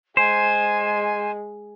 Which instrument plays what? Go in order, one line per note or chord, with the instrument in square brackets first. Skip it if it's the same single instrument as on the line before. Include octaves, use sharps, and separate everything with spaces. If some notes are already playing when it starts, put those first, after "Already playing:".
[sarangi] G#3 [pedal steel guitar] C5 [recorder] G#5